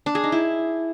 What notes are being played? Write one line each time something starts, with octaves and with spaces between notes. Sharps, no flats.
D4
G#4
D#4
E4